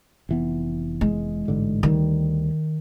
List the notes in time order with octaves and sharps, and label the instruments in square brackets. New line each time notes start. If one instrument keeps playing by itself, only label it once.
[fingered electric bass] F1 E3 B3
[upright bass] G#3
[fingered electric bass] A1 G#2 D3
[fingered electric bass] D2 G3 [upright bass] D#3